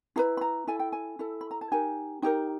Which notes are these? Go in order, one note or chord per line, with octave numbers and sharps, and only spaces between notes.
E4 G#4 B4 A#5
B5
A#5
E4 A4 G#5
G5
G#5
E4 A4
B5
A#5
A5
D#4 G4 A#4 G#5
D#4 G4 A#4 G5